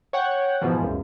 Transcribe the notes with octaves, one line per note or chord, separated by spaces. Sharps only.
C#5 F#5 G5
G#2 B2 E3 F3
C#2 F#2